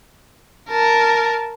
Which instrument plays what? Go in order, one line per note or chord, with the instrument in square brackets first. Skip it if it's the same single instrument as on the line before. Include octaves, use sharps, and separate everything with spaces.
[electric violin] A#4 A5